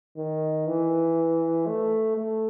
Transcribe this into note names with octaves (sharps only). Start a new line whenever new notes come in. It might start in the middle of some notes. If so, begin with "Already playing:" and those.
D#3
E3
A3
A3